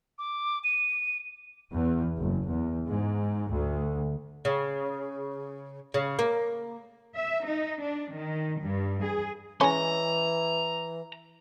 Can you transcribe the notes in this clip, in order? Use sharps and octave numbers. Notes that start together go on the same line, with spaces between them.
D6
D#7
E2
F#1
E2
G#2
D2
C#3
C#3
A#3
E5
D#4
D4
D#3
G2
G#4
E3 G#3 C#4 A#5 C6